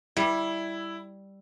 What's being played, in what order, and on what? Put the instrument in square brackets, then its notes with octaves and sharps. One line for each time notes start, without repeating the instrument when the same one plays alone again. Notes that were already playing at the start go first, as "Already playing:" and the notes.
[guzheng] G3 [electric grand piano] E4